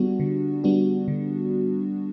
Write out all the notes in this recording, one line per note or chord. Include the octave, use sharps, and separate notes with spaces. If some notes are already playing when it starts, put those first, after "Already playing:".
Already playing: D3 G3 B3 D4 F#4
D3
G3 B3 D4 F#4
D3